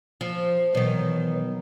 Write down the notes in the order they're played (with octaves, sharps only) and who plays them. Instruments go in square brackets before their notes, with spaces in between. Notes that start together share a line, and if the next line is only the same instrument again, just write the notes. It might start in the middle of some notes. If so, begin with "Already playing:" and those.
[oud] F3
[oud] B2 D#3 [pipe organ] E3 F#3